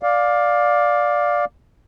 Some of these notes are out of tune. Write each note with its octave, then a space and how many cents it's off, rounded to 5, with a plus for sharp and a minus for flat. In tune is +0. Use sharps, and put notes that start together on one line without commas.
D5 +0 F5 +15